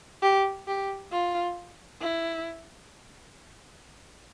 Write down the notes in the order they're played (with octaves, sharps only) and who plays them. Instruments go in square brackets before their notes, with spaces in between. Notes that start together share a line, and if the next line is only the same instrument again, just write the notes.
[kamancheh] G4
G4
F4
E4